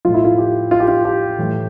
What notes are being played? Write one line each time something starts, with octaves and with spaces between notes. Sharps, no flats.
A2 F3 F4
E4
F4
G4
F4
G4
F4
G4
A2 E3